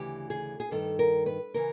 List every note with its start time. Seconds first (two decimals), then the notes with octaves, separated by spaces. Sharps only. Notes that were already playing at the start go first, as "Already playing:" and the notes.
Already playing: D2 C#3 E3 G4
0.30 G#4
0.60 G#4
0.71 G2 D#3 A4
0.99 A#4
1.26 B4
1.54 C#3 E3 A#4